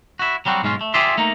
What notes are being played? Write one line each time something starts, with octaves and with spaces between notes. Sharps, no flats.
E4 F#4
F#3 G3 C4 F#4
B1 G#2 G#3 C#4 F4
A3
F4 G4 G#4 D5 E5 C6
A3 A#3 D#4